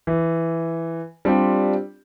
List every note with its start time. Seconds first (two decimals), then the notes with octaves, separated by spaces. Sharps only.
0.07 E3
1.25 G3 C4 D4 F4 G4